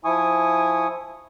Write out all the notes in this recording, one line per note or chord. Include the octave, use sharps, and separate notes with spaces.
F3 E4 G#5 C#6 D#6